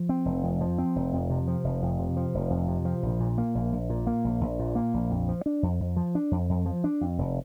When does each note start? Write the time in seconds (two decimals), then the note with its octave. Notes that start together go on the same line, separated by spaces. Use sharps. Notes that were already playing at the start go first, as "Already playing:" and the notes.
Already playing: F3
0.09 C4
0.25 F1
0.43 F2
0.61 F3
0.78 C4
0.96 F1
1.13 F2
1.30 C3
1.48 F3
1.64 F1
1.82 F2
1.99 C3
2.17 F3
2.34 F1
2.50 F2
2.68 C3
2.85 F3
3.03 A#1
3.20 A#2
3.38 A#3
3.55 A#1
3.72 A#1
3.90 A#2
4.07 A#3
4.24 A#1
4.41 A#1
4.59 A#2
4.75 A#3
4.94 A#1
5.10 F2
5.28 F3
5.46 D4
5.63 F2
5.80 F2
5.96 F3
6.15 D4
6.31 F2
6.50 F2
6.66 F3
6.84 D4
7.01 F2
7.18 F1